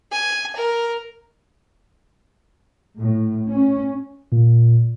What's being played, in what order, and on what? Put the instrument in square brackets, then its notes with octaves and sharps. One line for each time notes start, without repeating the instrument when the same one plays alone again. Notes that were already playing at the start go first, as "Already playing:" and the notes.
[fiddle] G#5
A#4
[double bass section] A2
C#4
[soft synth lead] A#2